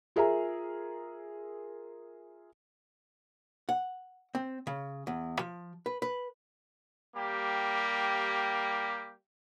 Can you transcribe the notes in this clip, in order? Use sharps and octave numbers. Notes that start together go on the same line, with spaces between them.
F4 G#4 A#4 E5 G#5 A#5
F#5
C4
C#3
E2
F3
B4
B4
G3 A#3 G4